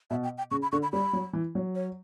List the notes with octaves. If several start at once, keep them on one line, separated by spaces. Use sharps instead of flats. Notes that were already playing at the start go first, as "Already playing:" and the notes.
B2 E5
G5
G5
C#3 C#6
B5
D3 C#6
B5
G3 B5
F#3
E3
F#3
C#5